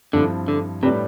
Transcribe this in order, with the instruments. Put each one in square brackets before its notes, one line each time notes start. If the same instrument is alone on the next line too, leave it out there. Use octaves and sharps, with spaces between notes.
[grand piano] G2 F3 C4 E4 [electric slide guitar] D3
[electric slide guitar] D3
[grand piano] A2 G3 D4 G4 B4 [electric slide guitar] C3